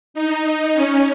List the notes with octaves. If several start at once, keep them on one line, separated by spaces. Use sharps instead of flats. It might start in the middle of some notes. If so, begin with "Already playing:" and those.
D#4
C#4